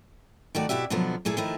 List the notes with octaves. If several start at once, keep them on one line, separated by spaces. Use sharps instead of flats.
D#3 A3 F#4 D5
B2 E4 F#4 G4 E5
B2 D3 F3 F#3 B3
A#2 A3 E4 G#4 A4
D#3 F3 A3 D#4 E4